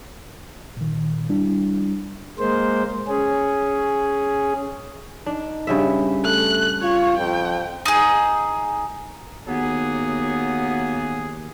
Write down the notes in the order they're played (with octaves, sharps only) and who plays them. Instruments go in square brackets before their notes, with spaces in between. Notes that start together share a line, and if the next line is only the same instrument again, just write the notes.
[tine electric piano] A#2 D#3
G3 D4 E4
[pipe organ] G#3 A#3 C5
C#4 G#4
[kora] D4 [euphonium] D#4
[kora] G2 C#3 E5
[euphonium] A3 [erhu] F#6
[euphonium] F4 [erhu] C#5
[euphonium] F2 [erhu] G5
[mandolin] D#4 G#4
[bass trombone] D#2 [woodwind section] F#3 A#3 B3 [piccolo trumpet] G#4